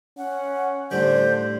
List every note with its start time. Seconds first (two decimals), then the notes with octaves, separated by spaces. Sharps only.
0.18 C#4 F#5
0.91 A2 D3 G3 C5 G6